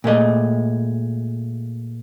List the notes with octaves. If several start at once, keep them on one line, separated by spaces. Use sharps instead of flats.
A#2 G#3 A3 D#5